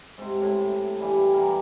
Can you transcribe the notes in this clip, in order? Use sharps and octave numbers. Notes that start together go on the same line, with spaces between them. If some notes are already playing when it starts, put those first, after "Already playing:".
G#2 C3
A2
G2 E3 G3
G4
E3 B3 A#4